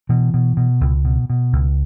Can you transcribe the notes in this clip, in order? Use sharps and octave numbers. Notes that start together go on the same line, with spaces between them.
B2 E3
B2
B2
C#2
B2
B2
C#2